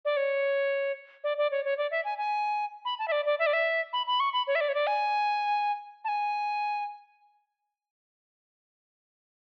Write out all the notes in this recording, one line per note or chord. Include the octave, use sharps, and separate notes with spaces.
D5
C#5
D5
D5
C#5
C#5
D5
E5
G#5
G#5
B5
A5
E5
D5
D5
E5
D5
E5
B5
B5
C#6
B5
C#5
E5
D5
C#5
D5
G#5
A5
G#5